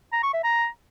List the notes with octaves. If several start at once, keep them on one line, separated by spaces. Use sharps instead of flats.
A#5
C#6
E5
A#5